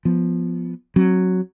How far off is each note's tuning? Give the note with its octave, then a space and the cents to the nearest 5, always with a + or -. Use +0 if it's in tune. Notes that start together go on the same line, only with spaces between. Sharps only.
F3 +0 B3 +0
F#3 +0 C4 +30